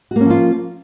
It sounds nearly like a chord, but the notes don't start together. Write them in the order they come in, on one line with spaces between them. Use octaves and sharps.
F#4 A#3 C#4 F3 F4